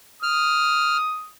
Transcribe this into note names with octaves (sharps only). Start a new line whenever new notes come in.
D#6 F6